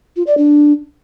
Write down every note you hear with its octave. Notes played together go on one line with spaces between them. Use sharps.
F4
D5
D4